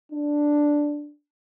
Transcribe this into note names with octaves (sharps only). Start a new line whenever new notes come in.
D4